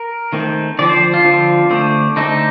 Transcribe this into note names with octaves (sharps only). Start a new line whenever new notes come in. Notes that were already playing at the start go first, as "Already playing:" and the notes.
Already playing: A#4
D#3 A3 C4
D3 F3 C4 D5
C5
F4
D3 F3 C4
D3 A3 C4
D3 A3 C4 D#4